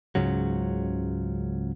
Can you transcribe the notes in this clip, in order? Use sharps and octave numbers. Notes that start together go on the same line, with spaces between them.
C#2 G#2 C#3 F#3